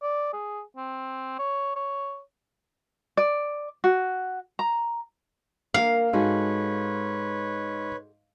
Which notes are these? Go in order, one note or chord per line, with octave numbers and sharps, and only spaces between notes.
D5
G#4
C4
C#5
C#5
D5
F#4
A#5
A#3 A#4 F5
G#2 F#4 G#4 A4 B4 C#5